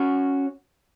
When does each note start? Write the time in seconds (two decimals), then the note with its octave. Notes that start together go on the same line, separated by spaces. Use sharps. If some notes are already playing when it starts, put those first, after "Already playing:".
Already playing: C#4 F#4